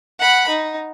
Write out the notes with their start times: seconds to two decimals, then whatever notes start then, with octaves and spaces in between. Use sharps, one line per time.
0.19 F#5 B5
0.49 D#4